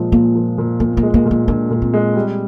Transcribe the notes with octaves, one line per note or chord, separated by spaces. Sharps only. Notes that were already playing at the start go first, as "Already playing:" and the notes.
Already playing: A#2 F3 G#3
A#2 A#3
F3
A#2
A#2 A#3
A#3
G#3
A#3
A#2
A#3
A#2 D4
A#2
C4
G#3
G3